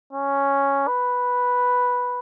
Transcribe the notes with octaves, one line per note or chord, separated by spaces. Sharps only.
C#4
B4